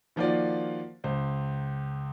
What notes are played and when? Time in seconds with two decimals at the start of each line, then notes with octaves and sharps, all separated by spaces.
0.16 D#3 F3 A#3 F4 F#4 D5
1.04 C#2 C5